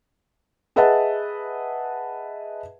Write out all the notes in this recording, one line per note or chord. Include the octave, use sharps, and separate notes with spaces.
G#4 B4 D#5 E5 F#5 A5